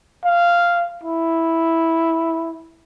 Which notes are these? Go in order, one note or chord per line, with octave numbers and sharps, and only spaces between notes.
F5
E4